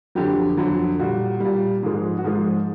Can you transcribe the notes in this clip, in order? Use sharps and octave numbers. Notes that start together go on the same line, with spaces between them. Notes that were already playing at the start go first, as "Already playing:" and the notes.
F2 D3 F#3 G4
F2 D3 F#3
A#2 G3 F#4
A#2 G3
G#2 F3 G#3
F#4
G#2 F3 G#3 F4